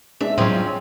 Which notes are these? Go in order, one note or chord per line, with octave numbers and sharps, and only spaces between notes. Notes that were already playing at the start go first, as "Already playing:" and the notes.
G#3 D4 E5
A2 F3 F#3 C4 C#4